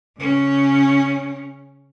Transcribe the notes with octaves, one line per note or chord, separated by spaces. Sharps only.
C#3 C#4